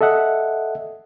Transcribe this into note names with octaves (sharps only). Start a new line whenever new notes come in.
A4 D#5 E5 F#5